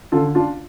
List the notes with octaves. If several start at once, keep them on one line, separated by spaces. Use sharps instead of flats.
D3 F4 A4
D4 F4